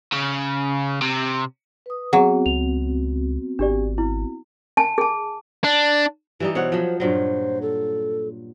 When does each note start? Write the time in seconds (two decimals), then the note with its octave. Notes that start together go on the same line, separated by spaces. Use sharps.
0.12 C#3
1.02 C3
1.86 B4 D#6
2.13 F#3 B3 C4 F#4 G#4
2.46 C#2 F7
3.59 G#1 D4 G4 D5
3.98 E4
4.77 G#5 A5
4.98 G#4 A5
5.64 D4
6.40 E3 G3 D#4 G4
6.55 B2 C5 C#5 F#5
6.72 F3 F#3
7.00 G2 A#2 F#3 C5
7.62 A4